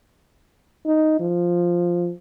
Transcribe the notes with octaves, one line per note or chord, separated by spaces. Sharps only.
D#4
F3